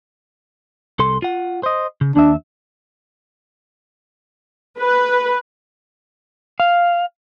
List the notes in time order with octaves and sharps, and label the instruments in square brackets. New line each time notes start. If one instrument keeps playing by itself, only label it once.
[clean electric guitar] C2 A4 C6
F4 F#5
C5 D#5
C#3
[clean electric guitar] D#2 E5 [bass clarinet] D4
[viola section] B4
[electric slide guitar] F5